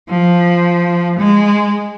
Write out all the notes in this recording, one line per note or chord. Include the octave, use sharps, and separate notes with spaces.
F3
G#3